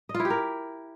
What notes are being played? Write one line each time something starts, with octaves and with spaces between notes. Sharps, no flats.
D#5
F4
E4
G4
A#4